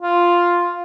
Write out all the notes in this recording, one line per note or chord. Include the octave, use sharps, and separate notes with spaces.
F4